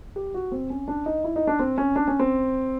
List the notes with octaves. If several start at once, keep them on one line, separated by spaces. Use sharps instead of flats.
G4
F#4
C4
C#4
D4
D#4
E4
D#4
D4
C4
C#4
D4
C#4
C4